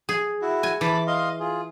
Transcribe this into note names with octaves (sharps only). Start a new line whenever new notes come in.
G#4
E4 F#4
G#5
E3 A5 B5 D6
D#5 F5 C6
F4 G#4